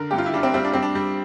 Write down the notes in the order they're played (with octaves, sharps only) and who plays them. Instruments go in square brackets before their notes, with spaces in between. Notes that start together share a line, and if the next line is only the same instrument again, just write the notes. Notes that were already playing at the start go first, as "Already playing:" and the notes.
Already playing: [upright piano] D3 A#4
G2 G4
F4
E4
G3 D4
C4
G3 C4
D4
G3 C4
D4
G3